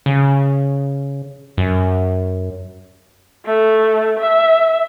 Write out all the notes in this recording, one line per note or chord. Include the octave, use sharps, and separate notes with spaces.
C#3
F#2
A3
E5